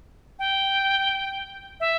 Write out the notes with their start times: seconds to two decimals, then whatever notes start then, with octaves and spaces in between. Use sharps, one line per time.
0.39 G5
1.80 E5